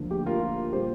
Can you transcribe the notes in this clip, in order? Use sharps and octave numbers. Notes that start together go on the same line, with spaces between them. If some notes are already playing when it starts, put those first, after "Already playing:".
Already playing: D2 D3 F3 A#3
G4
F4 A#4
A#2 G3 A#3 G4 C5